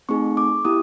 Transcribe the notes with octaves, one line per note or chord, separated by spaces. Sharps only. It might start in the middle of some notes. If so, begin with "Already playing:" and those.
A3 C4 D#4 G#4 C#6
D6
B3 E4 G4 D#6